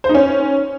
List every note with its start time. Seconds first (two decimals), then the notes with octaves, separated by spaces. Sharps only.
0.04 C5
0.09 D#4
0.15 C#4